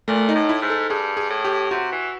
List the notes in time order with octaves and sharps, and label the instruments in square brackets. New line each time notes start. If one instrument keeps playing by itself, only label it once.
[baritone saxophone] A#2 [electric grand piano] A3
[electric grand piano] D#4
[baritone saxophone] A2
[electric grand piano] E4
[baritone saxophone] G#2
[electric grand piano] A4
[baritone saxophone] G2 [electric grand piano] G#4
[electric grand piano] G#4
[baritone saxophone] A2
[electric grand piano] G4
[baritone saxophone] C3 [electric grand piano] F#4
[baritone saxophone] E3